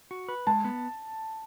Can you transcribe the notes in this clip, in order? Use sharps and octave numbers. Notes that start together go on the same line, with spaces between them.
F#4
B4
G#3 A5
B3